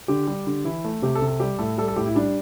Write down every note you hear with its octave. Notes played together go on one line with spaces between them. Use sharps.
D3 G4
G3
D3
E3 E4
A3
C3 G4
A4
C3
A4
G3 G4
A2 A4
G3 A4
A4
A2 G4
E4
G3 D4